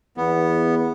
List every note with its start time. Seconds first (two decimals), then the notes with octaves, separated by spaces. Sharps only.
0.17 E2 B3